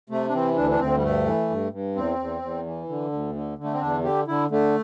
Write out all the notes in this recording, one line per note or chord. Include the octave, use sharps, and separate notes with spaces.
C3 A3
D4
E3 C4
D2 D4
D4
D2 C4
G3
G2 A3
E3
G2
G2
E2 C4
E2
E2
E3
D3
D2
D3
D3
A3
C4
E2 D4
D3 G4
D3 E4
D3 A3